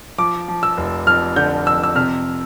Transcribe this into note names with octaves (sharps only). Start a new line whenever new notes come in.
F3 D6
F3
E6
F1
F2 F6
D3 G6
F2 E6
E6
C3 F6